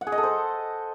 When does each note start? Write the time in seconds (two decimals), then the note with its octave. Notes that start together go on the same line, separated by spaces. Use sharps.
0.01 F#5
0.07 G#4
0.12 D#5
0.18 A4
0.23 C5